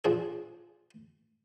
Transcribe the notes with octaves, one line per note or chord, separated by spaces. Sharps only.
F3 D4 G#4